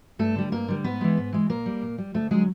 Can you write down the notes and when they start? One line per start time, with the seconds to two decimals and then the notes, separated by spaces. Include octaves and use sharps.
0.19 G2 A3 A4
0.36 D3 G3
0.52 G2 A#3 A#4
0.68 D3 G3
0.84 G#2 B3 B4
1.01 E3 G#3
1.17 G#2
1.33 E3 G#3
1.49 A#2 A#3 A#4
1.66 G3
1.82 A#2
1.98 G3
2.14 D2 A3 A4
2.31 D3 F#3 G#3 G#4